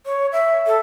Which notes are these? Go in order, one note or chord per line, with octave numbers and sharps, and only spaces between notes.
C#5
E5
A4